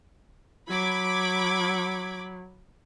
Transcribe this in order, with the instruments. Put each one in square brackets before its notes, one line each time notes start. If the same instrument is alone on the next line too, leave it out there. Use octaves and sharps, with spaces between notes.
[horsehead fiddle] F#3 [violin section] B5 D6 G#6